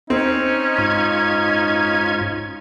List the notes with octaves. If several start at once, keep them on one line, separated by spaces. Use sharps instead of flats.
C4 C#4 D#4
G#2 F4 G#6